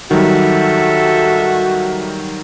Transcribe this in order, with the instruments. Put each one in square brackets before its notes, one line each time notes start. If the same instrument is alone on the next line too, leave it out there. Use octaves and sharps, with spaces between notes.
[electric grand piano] D#3 F#3 G3 [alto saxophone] F#4 [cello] A4 E5